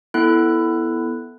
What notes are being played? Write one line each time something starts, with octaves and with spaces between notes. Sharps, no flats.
B3 E4 A4 F#6